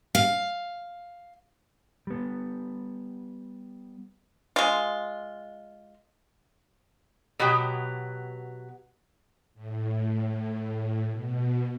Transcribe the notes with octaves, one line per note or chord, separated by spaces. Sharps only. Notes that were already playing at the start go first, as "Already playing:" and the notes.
F5
G3 B3
G#3 F4
B2 F#3 B3 G4
A2
B2